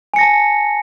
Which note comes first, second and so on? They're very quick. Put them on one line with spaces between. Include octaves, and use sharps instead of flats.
G#5 C#7 A#6 A5